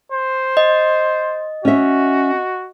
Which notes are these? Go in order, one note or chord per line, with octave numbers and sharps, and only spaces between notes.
C5
D#5
C#4 F#4 E5